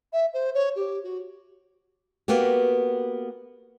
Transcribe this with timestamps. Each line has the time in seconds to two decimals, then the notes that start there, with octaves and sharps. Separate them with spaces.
0.13 E5
0.34 C5
0.54 C#5
0.76 G4
1.04 F#4
2.28 A#3 B3 F#4 G4